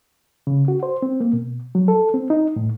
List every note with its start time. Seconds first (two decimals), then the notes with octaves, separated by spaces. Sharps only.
0.47 C#3
0.68 F#4
0.83 C5
1.02 C4
1.21 A#3
1.33 B2
1.75 F#3
1.88 A4
2.14 C4
2.30 D#4
2.56 A2